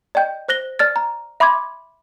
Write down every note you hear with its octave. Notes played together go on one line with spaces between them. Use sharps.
D5 D#5 G5 G6
C5 F#6 A#6 G7
D5 F6 A6
A#5
E5 B5 C6 D6 G#6